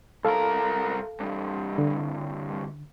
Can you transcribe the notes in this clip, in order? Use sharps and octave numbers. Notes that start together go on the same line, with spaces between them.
C2 A4 A#4 F5
C2 G2
D3